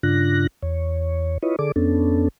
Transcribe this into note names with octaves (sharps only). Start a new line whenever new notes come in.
G2 C#3 D4 F4 F#6 A#6
E2 C#5
E4 F4 B4 C#5 D#5
D3 G#4 A4 D5 D6
F2 B3 C#4 D4 A4